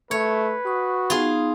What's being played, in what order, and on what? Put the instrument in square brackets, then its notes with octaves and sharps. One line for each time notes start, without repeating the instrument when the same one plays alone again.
[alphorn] A3 [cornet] B4 [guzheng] C#5
[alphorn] F#4 [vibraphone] C#6 D#6
[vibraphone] B3 D#4 [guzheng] F4 G#4